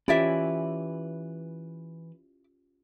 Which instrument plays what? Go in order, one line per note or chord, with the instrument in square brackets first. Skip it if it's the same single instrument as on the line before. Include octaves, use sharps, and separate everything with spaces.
[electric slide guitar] E3 B4 [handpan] C#4 F4 G4 [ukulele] E4 D5 E5